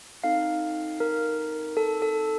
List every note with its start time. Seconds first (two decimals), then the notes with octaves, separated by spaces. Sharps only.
0.24 C4 D#4 A4 F5
1.00 A#4
1.77 A4
2.02 A4